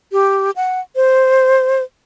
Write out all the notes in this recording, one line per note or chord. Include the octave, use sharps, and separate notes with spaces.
G4
F#5
C5